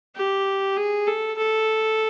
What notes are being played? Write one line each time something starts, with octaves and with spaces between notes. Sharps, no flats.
G4
G#4
A4
A4